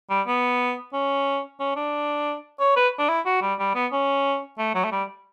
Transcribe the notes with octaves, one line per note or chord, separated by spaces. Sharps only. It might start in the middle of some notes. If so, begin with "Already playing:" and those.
G3
B3
C#4
C#4
D4
C#5
B4
D4
E4
F#4
G3
G3
B3
C#4
A3
F#3
A3
G3